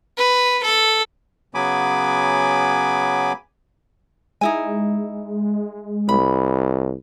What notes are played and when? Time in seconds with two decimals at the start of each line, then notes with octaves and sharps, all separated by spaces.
0.18 B4
0.63 A4
1.54 C#3 F#3 B3 G#5 B5 D6
4.41 G#3 D#4 E4 G#5
6.09 C2 B5